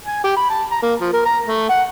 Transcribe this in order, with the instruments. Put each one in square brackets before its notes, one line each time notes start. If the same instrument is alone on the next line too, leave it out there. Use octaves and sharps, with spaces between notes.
[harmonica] G#5
G4
B5
A5
A#5
A#3
F3
A#4
A#5
A3
F#5